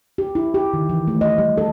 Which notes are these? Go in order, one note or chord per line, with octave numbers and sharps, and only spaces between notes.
G4
E4
G4
D#3
E3
A3
D#5
G3
A4